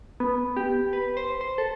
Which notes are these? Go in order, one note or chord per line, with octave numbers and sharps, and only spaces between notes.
B3
G4
B4
C5
C5
A4